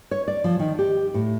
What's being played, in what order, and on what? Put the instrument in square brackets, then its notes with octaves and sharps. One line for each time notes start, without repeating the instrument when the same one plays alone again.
[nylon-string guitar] C#5
D5
F3
D#3
G4
A2